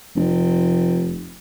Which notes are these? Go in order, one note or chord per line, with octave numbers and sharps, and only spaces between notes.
F1